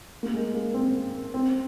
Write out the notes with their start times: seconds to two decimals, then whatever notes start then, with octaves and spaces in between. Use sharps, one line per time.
0.23 A#3
0.33 G#3
0.54 A#3
0.74 C4
1.34 C4